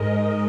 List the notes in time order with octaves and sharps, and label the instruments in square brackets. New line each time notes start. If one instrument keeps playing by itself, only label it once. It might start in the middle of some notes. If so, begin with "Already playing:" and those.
Already playing: [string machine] G#2 G#3 A#4 D#5